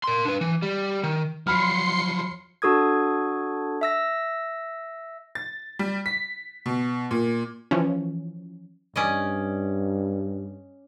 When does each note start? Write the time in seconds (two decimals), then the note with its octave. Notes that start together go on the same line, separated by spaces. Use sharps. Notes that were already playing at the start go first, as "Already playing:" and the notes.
0.04 A#4 C6
0.25 D4 B4
0.41 E3
0.62 G3
1.03 D#3
1.47 F3 F#3 B5 C6 F6 C7 C#7
2.62 D4 F#4 A4 D#6 G#6
3.81 E5 E6 A#6
5.35 A6
5.79 G3
6.06 B6
6.66 B2
7.11 A#2
7.71 E3 F3 C#4
8.96 G2 C#4 D5 D#5